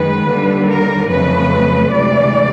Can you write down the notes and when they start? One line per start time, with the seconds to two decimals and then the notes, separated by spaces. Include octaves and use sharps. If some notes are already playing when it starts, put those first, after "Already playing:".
Already playing: F#2 D#3 G#3 B4
0.25 D#2 D3 G3
0.67 A#4
1.09 F2 C#3 F#3 A3 B4
1.92 D2 C3 E3 G#3 D5